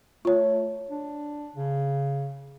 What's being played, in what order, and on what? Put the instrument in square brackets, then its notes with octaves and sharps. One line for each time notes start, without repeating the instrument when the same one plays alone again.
[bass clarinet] A3 [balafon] F4 C#5
[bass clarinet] D4
C#3